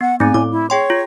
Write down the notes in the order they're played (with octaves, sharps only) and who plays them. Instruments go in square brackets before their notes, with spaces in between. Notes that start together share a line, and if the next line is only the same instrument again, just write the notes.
[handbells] B3 [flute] F#5
[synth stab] G#2 [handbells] A3 C4 [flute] G#5
[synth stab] A2 [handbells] D6
[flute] E4
[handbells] G#4 G5 C6 [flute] C#5
[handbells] F4